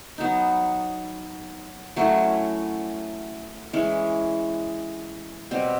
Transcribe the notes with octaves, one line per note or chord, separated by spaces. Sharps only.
F#3 B3 D#4
F#3 A3 C#4 E4
E3 G#3 C#4
B2 G3 C4